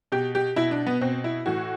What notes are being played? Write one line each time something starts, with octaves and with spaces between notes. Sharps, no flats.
B2 G4
G4
B2 E4
D4
B3
B2 C4
E4
A2 E3 F#4